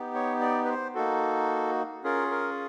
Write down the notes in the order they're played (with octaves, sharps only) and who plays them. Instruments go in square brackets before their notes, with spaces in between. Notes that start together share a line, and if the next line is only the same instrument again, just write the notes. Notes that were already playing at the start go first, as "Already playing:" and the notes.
Already playing: [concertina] B3 D#4 G4
C#5
D5
B4
C5
A#3 D#4 F#4 A4
C#4 F4 G#4 A#4
A#4